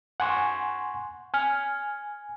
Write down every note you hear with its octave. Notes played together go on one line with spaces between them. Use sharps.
F#5 G#5 C6 C#6
G#5 F6